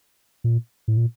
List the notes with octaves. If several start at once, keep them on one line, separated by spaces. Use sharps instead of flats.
A#2
A2
A#2